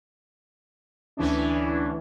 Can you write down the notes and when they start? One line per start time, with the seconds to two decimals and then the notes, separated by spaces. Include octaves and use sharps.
1.17 D2 E3 C#4 D4